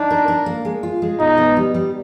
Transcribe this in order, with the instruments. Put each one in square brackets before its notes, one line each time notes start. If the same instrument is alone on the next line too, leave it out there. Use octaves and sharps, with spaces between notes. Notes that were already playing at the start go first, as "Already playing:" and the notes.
Already playing: [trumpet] D4 [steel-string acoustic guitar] D#4
[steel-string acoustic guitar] A#4
A#4
A#3
G#3
F4
G#3
[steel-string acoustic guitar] B2 [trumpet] D#4
[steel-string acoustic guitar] B3
G3
G3